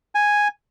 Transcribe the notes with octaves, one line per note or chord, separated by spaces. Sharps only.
G#5